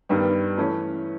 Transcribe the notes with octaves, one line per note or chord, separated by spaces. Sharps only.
G2 D#3 G3 B3
E3 A3 C#4